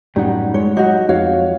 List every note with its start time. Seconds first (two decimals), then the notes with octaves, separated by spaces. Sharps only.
0.16 F#2 A2 G3 D#4 F#5
0.54 G#3 C#5
0.77 F#3 D#4 F#4
1.09 F2 F#4 C#5 F5